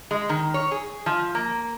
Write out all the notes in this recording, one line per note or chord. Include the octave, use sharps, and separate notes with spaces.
G#3
D#3
C#5
G#4
F3
A#3